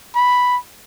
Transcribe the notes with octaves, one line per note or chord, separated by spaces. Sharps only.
B5